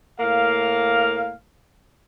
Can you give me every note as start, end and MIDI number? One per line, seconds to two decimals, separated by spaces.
0.20 1.34 45
0.20 1.34 58
0.20 1.34 77